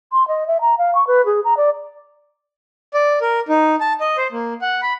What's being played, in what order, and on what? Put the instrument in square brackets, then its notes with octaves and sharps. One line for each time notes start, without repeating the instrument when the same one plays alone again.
[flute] C6
D#5
E5
A#5
F5
C#6
B4
G#4
A#5
D5
[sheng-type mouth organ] D5
A#4
D#4
A5
D#5
C5
A#3
F#5
B5